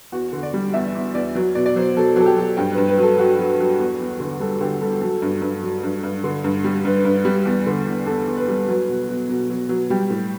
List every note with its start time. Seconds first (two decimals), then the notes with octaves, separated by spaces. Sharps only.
0.12 E2 F#4
0.33 D3
0.43 D5
0.54 G3
0.74 E2 E5
0.95 E2
1.14 E2 D5
1.35 F#3
1.55 B2 D5
1.66 D5
1.76 F#3 C5
1.96 F#3 A4
2.16 F#3 A4
2.26 G4
2.37 F#3
2.57 G2 G4
2.72 B4
2.78 G2
2.88 B4
2.97 F#3
3.02 A4
3.18 F#3 F#4
3.39 F#3
3.60 F#3
3.79 E2
4.00 E2
4.20 D3
4.40 G3 A4
4.60 D3 G4
4.81 G3 A4
5.01 F#3 A4
5.22 G2
5.42 G2
5.63 F#3
5.84 G2
6.03 G2
6.24 D3
6.44 G2
6.64 G3
6.85 G2 B4
7.05 G2
7.25 G3
7.45 E2
7.66 D3
7.87 E2
8.06 E2 A4
8.27 E2
8.37 B4
8.48 G3
8.68 F#3 B4
8.88 B2
9.09 B2
9.29 B2
9.50 F#3
9.69 F#3
9.90 G3 G4
10.10 A2